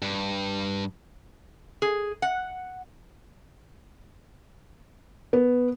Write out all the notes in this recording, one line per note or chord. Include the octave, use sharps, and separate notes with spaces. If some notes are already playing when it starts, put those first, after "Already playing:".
G2
G#4
F#5
B3